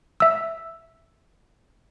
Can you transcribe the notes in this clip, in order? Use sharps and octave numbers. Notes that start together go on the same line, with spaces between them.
E5 E6